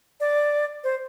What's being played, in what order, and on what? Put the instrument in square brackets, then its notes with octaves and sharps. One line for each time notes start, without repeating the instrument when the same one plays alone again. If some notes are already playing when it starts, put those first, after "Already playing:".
[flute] D5
C5